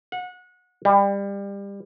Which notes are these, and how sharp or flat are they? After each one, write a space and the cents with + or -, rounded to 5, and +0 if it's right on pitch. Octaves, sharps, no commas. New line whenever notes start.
F#5 -25
G3 +25